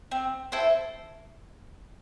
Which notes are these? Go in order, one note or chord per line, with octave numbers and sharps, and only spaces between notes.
C4
E4 A4 C5